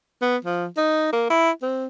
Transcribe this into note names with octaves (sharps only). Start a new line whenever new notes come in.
B3
F3
D#4
A#3
E4
C4